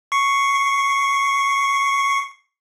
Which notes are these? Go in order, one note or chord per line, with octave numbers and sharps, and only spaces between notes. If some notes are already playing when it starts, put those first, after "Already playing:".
C#6 C7 C#7